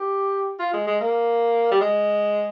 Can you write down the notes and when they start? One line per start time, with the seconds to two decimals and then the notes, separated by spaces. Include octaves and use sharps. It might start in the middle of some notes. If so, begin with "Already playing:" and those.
Already playing: G4
0.60 F4
0.74 G#3
0.87 G#3
1.00 A#3
1.72 G3
1.81 G#3